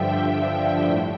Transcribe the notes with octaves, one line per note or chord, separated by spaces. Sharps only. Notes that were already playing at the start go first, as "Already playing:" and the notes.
Already playing: G2 D3 F3 E5 G5
A2